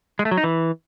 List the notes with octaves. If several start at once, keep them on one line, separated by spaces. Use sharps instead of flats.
G#3
A3
F#3
D#4
E3